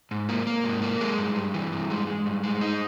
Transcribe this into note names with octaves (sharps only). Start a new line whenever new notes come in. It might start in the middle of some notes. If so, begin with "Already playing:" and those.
G#2
A#3
A#3
G#2
A#3
G#3
G2
G2
E3
G2
G#3
G#3
G2
G#3
D#4